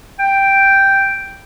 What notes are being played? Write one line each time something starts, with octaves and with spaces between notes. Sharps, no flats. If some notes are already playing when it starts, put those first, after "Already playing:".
G5